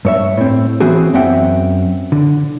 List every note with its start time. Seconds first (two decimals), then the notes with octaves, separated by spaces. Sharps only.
0.05 G2 C#5 E5
0.37 A2 C4
0.80 E3 B3 C4 F#4 G#4
1.14 F#2 B3 C4 E5 F#5 G5
2.12 D3